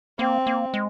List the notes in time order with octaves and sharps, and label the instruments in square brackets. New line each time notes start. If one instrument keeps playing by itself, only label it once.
[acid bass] A#3 [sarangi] C4
[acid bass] A#3
G#3